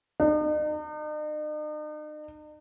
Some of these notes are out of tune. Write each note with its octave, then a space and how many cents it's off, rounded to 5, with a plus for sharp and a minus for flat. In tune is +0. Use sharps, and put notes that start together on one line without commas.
D#4 -45